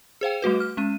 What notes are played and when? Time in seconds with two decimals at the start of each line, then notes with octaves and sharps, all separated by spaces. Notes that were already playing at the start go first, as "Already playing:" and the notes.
0.21 G#4 C5 F5 G5
0.42 G3 A3 F#4 B4
0.60 F6
0.77 G#3 C#4 D#7